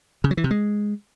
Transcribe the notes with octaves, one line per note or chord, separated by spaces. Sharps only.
C#3
F#3
E3
C3
G#3